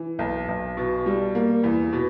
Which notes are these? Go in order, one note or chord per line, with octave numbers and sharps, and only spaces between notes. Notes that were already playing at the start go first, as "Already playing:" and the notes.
Already playing: E3
B1
B1
B2
G3
A#3
E2
B2